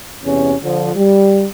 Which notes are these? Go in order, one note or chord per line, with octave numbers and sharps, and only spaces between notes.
E2 C3 C#4
D3 F3
G3